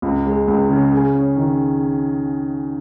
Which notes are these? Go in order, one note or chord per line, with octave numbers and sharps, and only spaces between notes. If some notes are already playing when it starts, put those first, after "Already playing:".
C#2
G#3
C#2
C#3
G#4
C#4
D#3